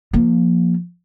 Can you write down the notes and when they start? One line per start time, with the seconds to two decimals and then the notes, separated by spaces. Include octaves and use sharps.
0.13 F3 A#3